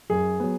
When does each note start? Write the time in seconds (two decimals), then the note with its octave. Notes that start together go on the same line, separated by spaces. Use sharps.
0.10 F#2 G#4
0.40 F#3 B3